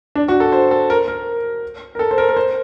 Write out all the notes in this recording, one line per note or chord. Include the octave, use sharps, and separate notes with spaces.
D4
F#4
A4
C5
A4
A#4
A#4
A#4
A4
C5
A#4
A#4
C5